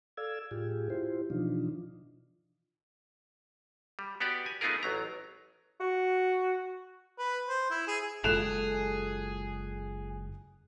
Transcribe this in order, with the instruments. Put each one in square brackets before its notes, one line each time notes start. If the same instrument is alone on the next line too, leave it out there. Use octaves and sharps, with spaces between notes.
[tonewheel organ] A4 D5 F5 E6 G#6
A2 F4 G4 G#4
E4 F4 G4 C5
B2 E3 F3 D4 D#4 F4
[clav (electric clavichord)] G3
B3 F#4 G4 D5
G#5
A3 B3 D#4 F4 G#4 A#4
A1 F#3 A#5
[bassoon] F#4
[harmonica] B4
C5
E4
G#4
[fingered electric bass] F#1 G#3 [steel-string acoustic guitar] F4 A4 [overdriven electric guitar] G#4 [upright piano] F#6 E7 F7